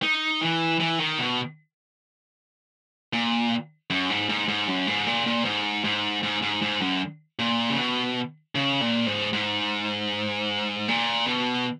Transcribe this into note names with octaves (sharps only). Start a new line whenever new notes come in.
D#4
E3
E3
D#3
B2
A#2
F#2
G#2
G#2
G#2
F#2
G#2
A#2
A#2
G#2
G#2
G#2
G#2
G#2
F#2
A#2
C#3
B2
C#3
A#2
G#2
G#2
A#2
B2